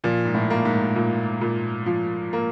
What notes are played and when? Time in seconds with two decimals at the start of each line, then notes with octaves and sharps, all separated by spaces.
0.04 A#2 F3
0.25 G#2
0.35 A2
0.50 A#3
0.65 G#2
0.96 A#2
1.41 A#2
1.86 F3
2.33 A#3